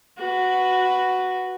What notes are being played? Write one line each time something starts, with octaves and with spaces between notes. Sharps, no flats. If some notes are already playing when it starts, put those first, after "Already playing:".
F#4 B4